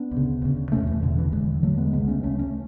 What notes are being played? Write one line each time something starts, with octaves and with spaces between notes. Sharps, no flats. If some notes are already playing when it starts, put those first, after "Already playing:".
Already playing: B3 D4
D2
C#3
D2 C#3
E2 B2 A3 C#4
E3
E2 B2 D3
E3
E2 D3 E3 G#3
E2 D3 F#3 A3
G#3 B3
C#2 C#3 G#3 B3
A3 C#4
C#2 C#3 A3 C#4
A3 C#4